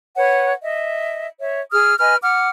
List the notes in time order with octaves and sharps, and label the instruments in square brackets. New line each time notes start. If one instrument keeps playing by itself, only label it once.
[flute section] B4 C#5 F#5
D#5 E5
C#5 E5
G#4 D#6 F6
B4 D#5 G#5 F6
F#5 D6 F6